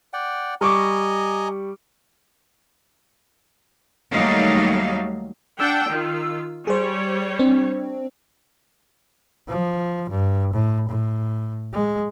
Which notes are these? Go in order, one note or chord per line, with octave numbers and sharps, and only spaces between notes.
D5 F#5 G5
G3 D#5 G#5 A#5 C#6 D6
D#2 F#3 G3 A3 D#4 F5
D4 F#5 G5 E6
D#3 F4
G3 G#4 C5 C#5
C4 D4
F3
G2
A2
A2
G#3